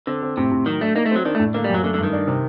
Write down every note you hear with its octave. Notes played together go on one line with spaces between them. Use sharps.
D3 C4
C4
A2 C3
A2
D#3 F#3
A3 D4
A#3 D#4
A3
F#3 C4
D#3 D4
A3
A2
D3 A#3
G3
F#2
F#3
D3 A3
D3
G2 D#3
D4
C3